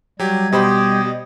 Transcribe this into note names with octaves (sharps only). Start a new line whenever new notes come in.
F#3 G3 G4 G#6
B2 G4 C5 D#5 B5